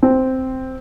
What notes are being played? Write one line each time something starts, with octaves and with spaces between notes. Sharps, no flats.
C4